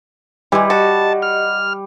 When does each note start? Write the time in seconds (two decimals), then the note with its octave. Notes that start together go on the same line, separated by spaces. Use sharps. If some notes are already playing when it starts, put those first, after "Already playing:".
0.52 E3 G3 G#3 G4 D#5
0.70 F#4 A5
1.22 F6